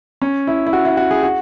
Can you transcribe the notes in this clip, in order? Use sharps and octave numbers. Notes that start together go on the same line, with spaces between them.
C#4
E4
E4
F#4
E4
F#4
G#4
F#4